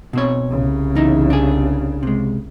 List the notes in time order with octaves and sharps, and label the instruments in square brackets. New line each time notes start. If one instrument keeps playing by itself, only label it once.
[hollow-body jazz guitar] B2 C4 C#5
[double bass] C2 C#3
[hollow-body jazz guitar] E2 D#4 E4
D4 G#4
C3 G#3